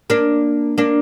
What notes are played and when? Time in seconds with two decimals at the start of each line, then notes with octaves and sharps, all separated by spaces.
0.10 A#3 D4
0.78 A#3 D4